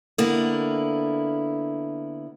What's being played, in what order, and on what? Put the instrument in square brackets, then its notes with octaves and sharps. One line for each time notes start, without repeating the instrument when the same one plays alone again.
[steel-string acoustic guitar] D3 A#3 B3 E4